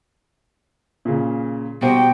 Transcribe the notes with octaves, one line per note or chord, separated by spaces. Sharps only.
A#2 C#3
B2 G3 F#4 C5 G5